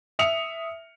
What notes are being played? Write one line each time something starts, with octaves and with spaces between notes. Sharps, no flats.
E5 D#6 C#7 F7